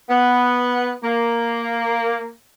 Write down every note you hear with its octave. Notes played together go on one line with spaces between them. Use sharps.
B3
A#3